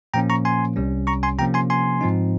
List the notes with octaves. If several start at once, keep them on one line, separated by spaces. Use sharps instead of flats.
A#2 F3 A#3 C#4 G5 A#5
A#5 C#6
G#5 C6
C2 C3 G3 C#4
A#5 C#6
G#5 C6
C3 F3 A#3 C#4 G5 A#5
G#5 C6
G#5 C6
G#2 F3 C4 D#4